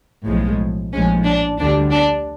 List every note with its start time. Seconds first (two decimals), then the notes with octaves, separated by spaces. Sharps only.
0.27 B1 A2 F3 G#3
0.93 A#1 A2 F3 G#3 C#4
1.26 D4
1.59 D2 D3 G3 D4
1.92 D4